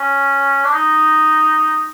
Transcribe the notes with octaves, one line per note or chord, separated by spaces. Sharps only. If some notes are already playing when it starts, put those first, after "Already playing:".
Already playing: C#4
D4
D#4